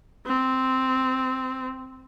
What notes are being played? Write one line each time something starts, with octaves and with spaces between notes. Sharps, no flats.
C4